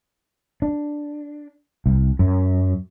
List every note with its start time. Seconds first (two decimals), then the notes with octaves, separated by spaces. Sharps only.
0.62 D4
1.86 C2
2.19 F#2